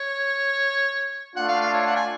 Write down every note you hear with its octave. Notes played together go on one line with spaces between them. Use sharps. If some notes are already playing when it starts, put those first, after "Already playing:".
Already playing: C#5
A3 D4 F4 F#5
F5
F5
C#5
F#5
G#5